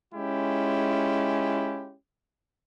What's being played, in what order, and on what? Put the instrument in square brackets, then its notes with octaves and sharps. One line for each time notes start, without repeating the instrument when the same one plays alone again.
[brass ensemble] G#3 C#4 E4 F4 G4